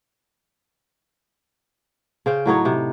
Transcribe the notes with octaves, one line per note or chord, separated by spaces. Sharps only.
C#3 C5 G5
A2 F#3 D#4 C#5
C3